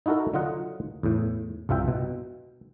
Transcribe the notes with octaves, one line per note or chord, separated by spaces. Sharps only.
D#4 E4 F#4 A4 A#4
D3 F#3 F4 D#5 F#5
E2 A2
C2 G2 F4 E5 G5
B2